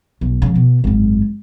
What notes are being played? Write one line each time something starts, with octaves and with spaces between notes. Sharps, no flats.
B1
C#3 F3
B2
G#1 F#2